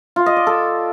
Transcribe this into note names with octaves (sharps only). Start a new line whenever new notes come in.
F4
D#5
D5
A4